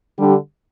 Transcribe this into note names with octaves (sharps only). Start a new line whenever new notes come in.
D3 G3 D4 G4